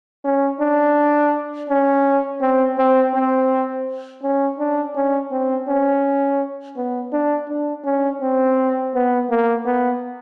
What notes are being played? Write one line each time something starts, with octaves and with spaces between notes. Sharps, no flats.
C#4
D4
C#4
C4
C4
C4
C#4
D4
C#4
C4
C#4
B3
D4
D4
C#4
C4
B3
A#3
B3